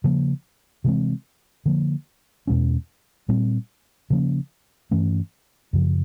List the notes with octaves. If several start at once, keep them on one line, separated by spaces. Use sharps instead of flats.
C#3 F3 A#3
C3 E3 G#3 C4
D3 F3 A#3
E2 B2 G#3 C#4
A#2 G3 C4
C#3 F3 A#3 C#4
G2 E3 A3 C#4
F#2 C#3 F3